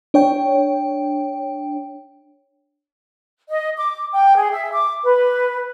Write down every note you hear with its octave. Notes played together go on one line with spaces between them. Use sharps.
D4 C#5 G5
D#5
D6
G5
G#4
E5
D6
B4